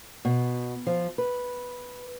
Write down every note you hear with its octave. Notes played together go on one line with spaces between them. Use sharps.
B2
F3
B4